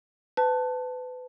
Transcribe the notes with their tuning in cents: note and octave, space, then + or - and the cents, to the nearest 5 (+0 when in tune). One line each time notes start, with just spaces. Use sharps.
B4 +30 A5 +5